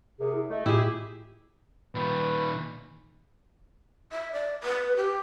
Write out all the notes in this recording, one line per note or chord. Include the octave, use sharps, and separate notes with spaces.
F#2 C3 G#4
E4
A3 D#5
A2 E4 F4 G4 G#4
A#2 D#3 B4
E5
D5
B4
G4